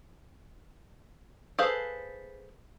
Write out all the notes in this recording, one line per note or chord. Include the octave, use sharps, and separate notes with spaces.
G#4 A4 B4 C5 F5